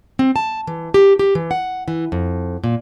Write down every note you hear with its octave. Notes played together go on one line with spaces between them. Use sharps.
C4
A5
E3
G4
G4
E3
F#5
E3
F2
A#2